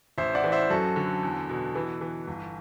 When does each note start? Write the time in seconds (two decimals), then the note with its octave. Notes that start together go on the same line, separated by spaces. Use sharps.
0.18 A1 C5 E5
0.35 D5 F#5
0.44 E3
0.52 C5 E5
0.70 F#2 F#4 A4
0.96 D3
1.23 E2
1.49 B2
1.75 E3
2.01 E3
2.28 G1